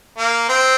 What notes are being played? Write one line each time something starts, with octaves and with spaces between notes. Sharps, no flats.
A#3
C4